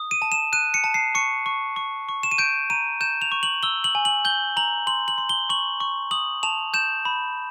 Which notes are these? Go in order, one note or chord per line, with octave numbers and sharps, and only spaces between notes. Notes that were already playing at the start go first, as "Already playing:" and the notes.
Already playing: D#6
D#7
A5
E7
F#6 D#7
C#7
A5
C7
C#6 C#7
C#6
C#6
C#6
E7
D#7
G6 D7
A#5 D#7
G6 E7
F7
C#6
F#7
E6 G7
F#7
G#5
F#7
G6 G7
A#5 F#7
C6 F#7
F#7
C6
G7
C#6 F#7
C#6
D#6 F#7
A5 F7
G6 E7
B5